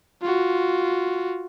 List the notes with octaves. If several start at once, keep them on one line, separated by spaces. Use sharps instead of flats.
F4 F#4